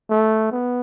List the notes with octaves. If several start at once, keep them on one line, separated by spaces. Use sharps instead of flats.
A3
B3